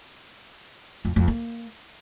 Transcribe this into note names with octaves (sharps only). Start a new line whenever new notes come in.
F2
F2
A#3